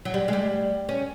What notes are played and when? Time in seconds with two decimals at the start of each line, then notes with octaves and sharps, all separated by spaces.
0.05 F#3
0.14 G3
0.28 G#3
0.33 G3
0.89 C#4